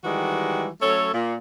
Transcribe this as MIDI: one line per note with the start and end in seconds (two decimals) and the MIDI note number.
0.05 0.68 51
0.05 0.68 52
0.05 0.68 55
0.05 0.68 56
0.05 0.68 66
0.81 1.12 54
0.81 1.12 57
0.81 1.12 61
0.81 1.12 69
0.81 1.12 73
1.13 1.35 46